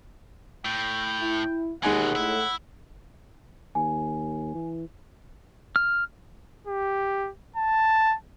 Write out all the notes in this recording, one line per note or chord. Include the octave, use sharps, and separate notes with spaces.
A2 G5
E4
D#2 B2 E3 G#3 D#4 F#5 G#5
A2 E4
D#2 G#5
E3
F6
G4
A5